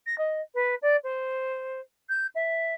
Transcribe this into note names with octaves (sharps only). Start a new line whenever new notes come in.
A#6
D#5
B4
D5
C5
G6
E5